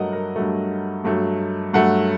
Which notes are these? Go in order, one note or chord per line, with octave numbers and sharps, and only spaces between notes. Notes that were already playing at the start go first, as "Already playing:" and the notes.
Already playing: G2 F#3 A3 A#4 D#5 F#5
A#4
G2 F#3 A3
G2 F#3 A3
G2 F#3 A3 F#5